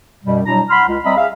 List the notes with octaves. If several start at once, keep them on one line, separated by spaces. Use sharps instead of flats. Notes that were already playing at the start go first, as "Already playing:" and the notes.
F#2 B2 G3
B2 F#3 G3 D4 E4 A#5
F#5 B5 C6 F6
C#2
G3 C4 D#5 E5 A#5 B5
G#4 E5 F5